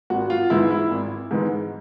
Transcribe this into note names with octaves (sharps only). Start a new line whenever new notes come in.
G#1 F#4
F4
G#2 E3 G#3 E4
E4
G#1
G#2 E3 G#3